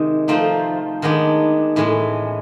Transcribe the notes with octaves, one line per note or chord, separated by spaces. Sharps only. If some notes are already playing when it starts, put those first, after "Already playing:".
Already playing: C3 D#3 G#3
F3 A3 C4 D#4
D#3 G#3 B3 D4
A2 E3 G#3 C#4